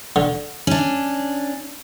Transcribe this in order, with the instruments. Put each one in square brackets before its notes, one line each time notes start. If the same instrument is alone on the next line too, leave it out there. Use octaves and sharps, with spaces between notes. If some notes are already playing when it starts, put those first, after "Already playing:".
[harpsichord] D3
[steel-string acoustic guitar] C#4 D4